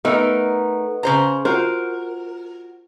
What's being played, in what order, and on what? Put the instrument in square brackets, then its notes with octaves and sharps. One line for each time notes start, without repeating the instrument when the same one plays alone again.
[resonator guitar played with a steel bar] A3 D#4 A#4 [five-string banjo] B3
[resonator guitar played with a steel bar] C#3 C5 A#5
[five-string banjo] F4 F#4 C5 [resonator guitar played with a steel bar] A#4